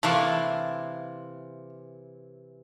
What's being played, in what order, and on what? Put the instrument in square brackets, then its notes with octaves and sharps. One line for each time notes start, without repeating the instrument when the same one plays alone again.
[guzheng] C3 E3 E4 [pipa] A3 A#3 F4